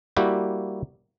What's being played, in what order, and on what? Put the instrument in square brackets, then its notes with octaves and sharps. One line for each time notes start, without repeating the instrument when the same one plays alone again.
[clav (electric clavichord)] G3 A#3 E4 F#4 G4